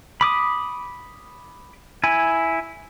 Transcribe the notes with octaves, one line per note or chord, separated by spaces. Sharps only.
B5 D6 D#6
E4 G#5